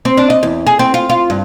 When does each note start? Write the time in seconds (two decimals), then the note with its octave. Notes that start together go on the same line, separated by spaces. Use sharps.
0.05 C4
0.17 D4
0.30 D#5
0.43 E2
0.67 G#4
0.79 C4
0.94 F4
1.10 F4
1.30 G2